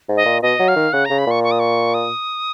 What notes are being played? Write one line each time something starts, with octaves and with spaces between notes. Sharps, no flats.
G#2
D#5
A#2
B2 D#5
F#3
F5
D#3
C#3 F#5
C#3 A#5
B5
A#2 C#6
C#6
D#6
C#6
D#6